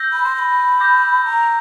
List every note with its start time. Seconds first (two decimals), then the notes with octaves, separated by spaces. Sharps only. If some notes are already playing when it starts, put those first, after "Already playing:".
Already playing: E6 G6 A#6
0.12 B5
0.24 C6
0.35 C6
0.39 B5
0.80 D6 G6 A#6
1.26 A#5